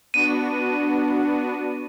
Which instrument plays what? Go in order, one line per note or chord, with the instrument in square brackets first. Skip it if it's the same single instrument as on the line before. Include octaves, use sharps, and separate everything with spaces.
[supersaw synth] B3 D4 F#4 [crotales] D#7